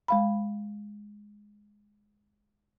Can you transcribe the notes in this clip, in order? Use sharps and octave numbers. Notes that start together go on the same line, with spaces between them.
G#3 F5 B5